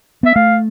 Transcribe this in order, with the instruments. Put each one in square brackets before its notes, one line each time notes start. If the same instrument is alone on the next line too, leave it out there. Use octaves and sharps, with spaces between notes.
[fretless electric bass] B3 [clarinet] E5
[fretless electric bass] A3 [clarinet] F5